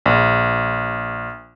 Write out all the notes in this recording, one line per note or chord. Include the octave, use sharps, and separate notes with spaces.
A#1